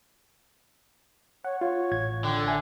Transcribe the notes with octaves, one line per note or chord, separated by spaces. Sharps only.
C#5 F#5
F4 C#5
A1 G#6
D3 G5
A4
E5 G#5